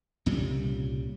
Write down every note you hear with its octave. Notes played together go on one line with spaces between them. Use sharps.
C2 A#2 C#3 G3